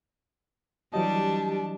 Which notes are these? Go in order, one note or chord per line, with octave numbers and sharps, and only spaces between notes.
E3 F#3 G3 D4 G4 D#5 A5